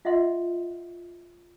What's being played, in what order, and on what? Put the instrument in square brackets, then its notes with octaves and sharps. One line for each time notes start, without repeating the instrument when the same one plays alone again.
[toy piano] F4 D#5 E5 F#5 C6